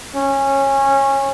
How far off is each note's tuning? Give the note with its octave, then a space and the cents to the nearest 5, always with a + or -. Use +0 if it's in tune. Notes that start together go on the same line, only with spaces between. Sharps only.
C#4 -20